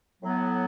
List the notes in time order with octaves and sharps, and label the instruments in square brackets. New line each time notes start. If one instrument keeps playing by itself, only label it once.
[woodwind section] A2 F#3 B3